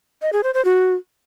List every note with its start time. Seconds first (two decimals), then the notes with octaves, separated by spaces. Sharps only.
0.22 D#5
0.33 G#4
0.43 C5
0.54 C5
0.65 F#4